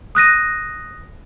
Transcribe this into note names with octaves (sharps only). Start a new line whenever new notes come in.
D#6 F#6 A#6 D#7